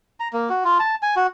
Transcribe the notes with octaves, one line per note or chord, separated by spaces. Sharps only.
A#5
A#3
F#4
F4
A5
G#5
F#4